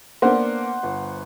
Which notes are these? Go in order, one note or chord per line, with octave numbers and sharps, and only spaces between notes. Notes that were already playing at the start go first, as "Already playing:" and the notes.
A#3 B3 D4 C5 F#5 C6
G1